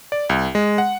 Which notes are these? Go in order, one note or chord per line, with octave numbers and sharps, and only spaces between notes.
D5
C2
G#3
F#5